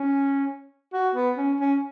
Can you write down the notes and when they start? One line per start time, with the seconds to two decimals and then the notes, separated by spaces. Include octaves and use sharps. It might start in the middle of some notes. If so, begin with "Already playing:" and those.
Already playing: C#4
0.93 F#4
1.15 B3
1.38 C#4
1.60 C#4